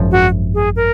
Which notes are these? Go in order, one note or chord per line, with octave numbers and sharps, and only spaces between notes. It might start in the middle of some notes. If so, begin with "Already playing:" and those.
Already playing: G#1 F#2 F3
F#4
G#4
A#4